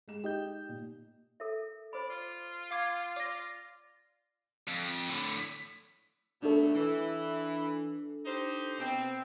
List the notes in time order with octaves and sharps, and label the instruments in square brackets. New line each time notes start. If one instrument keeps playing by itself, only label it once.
[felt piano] G#3 E7
[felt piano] D#4 [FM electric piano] G4 D#5 G6
[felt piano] A#2
[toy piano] A4 A#4 E5
[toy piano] C5 B5 [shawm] D5
[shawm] F4
[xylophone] F5 D6 G#6
[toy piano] D5 [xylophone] D6 A#6
[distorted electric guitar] F2
A2 D3
[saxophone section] B2 F#3 A3 [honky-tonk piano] D4 A4
[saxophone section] E3
D#4 G4 C5
B2 C4